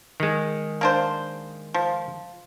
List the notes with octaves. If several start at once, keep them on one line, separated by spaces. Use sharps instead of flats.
D#3 G#3
A#3 D4 C5
F3